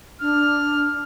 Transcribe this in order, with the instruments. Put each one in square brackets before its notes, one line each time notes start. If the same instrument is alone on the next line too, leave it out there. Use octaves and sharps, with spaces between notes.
[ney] D4 [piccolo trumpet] F6